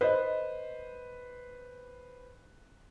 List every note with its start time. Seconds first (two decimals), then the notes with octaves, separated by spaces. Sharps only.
0.01 A4 B4 C5 D#5